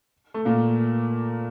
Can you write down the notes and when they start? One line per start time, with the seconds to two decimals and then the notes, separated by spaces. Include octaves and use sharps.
0.34 A3
0.45 A#2 A#3